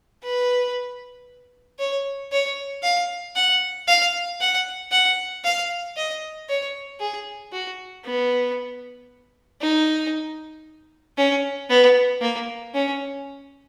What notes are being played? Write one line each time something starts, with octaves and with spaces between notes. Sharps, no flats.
B4
C#5
C#5
F5
F#5
F5
F#5
F#5
F5
D#5
C#5
G#4
F#4
B3
D#4
C#4
B3
A#3
C#4